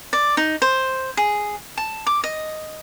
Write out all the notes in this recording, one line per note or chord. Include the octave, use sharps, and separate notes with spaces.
D5
D#4
C5
G#4
A5
D6
D#5